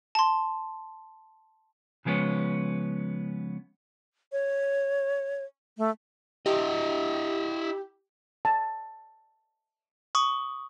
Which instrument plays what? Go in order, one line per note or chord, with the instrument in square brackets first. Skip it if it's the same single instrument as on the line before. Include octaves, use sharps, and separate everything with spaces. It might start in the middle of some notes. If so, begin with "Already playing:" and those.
[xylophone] A5 C6
[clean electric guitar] C#3 F3 G#3 B3 C#4
[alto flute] C#5
A3
[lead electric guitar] E4 D#5 [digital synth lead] G4
[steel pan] A5
[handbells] C#6 D#6